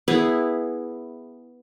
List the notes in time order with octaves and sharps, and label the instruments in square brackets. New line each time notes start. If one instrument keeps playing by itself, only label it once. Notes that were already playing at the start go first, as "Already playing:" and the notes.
[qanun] B3 E4 G#4